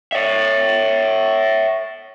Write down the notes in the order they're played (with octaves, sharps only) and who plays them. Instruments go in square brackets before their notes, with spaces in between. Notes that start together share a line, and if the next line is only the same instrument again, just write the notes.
[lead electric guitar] C#5 E5